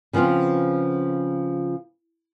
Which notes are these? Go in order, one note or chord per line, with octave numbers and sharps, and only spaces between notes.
C#3 F3 B3 C4 F4